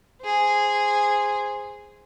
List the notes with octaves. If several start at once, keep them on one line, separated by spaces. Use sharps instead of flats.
G#4 C5